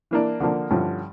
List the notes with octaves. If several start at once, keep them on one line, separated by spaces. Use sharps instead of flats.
E3 A#3 D4
D3 F3 A#3 D4
G2 D3 F3 C#4 E4